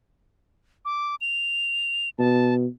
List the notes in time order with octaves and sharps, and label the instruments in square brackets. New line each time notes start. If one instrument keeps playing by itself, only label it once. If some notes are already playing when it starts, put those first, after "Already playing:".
[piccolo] D6
F7
[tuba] B2 [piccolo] A5